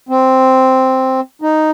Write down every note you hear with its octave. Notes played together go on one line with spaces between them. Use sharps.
C4
D#4